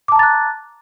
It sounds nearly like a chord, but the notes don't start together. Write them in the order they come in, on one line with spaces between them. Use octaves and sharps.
D6 A5 A#5 A6 F#6